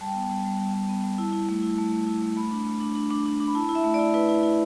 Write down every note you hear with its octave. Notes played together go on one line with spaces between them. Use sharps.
G3 A5
G5
B3 A5
G3
G3
G3
G3
B3
G3
E4 A5
E4
A3
E4
A3
A3
E4
A3
A3 B5
D4
A3
D4
D4
D4
D4
D4
B5
E4 A5
E4
E5
A3
E4 D5
E4 B4
E4
E4